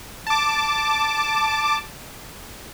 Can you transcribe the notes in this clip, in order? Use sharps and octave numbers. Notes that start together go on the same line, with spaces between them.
A5 D6